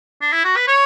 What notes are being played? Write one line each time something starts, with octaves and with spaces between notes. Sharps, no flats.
D4
E4
F#4
B4
C#5